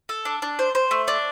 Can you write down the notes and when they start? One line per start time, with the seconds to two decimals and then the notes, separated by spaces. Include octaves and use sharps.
0.09 A4
0.25 D4
0.42 D4
0.59 C5
0.75 C5
0.91 A3
1.08 D4